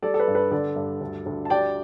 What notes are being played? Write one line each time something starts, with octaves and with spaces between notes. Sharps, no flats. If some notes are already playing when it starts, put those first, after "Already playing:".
G3 A4 D5
A4
B4
G2
B4
D3 A4 D5
G2
D2
D2
A5
G3 D5 G5